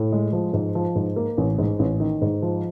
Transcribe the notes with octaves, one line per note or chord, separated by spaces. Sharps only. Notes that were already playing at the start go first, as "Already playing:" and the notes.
Already playing: A2
G#3
F3
G#2
F3
G#2
A#3
A1
G#2
A1
D#3
G#2
F3